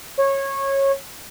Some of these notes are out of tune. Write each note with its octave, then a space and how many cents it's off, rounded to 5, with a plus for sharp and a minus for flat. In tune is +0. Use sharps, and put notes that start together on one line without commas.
C#5 -20